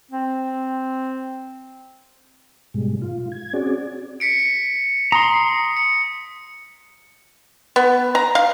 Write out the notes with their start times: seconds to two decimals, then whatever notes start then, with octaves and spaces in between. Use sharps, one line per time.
0.11 C4
2.74 G#2 B2 G3 G#3
3.02 F4
3.32 G#6
3.53 C4 C#4 F#4 G#4 D5
4.20 B6 C#7 D7
5.12 A#5 C6 D#6
5.77 C#7
7.76 B3
8.15 A#5
8.35 F5